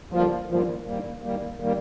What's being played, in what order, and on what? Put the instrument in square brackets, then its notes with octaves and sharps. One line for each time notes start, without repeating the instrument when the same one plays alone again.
[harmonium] D#2 D3 G3 A#3 F4 [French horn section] F3
[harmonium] G#2 D#3 G3 A#3 [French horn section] F3
[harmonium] G#2 D#3 G3 A#3
G#2 D#3 G3 A#3
D#3 G3 A#3